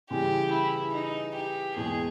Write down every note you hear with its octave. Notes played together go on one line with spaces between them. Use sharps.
C#3 E3 G3 G4
E4
D#4
G4
E2 B2 G#3 G#4